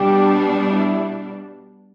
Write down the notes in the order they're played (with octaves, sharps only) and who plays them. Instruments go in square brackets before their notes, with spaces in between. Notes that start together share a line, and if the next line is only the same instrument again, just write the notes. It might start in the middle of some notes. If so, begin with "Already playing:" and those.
Already playing: [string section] B2 G3 D4 [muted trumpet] G4
[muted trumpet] E4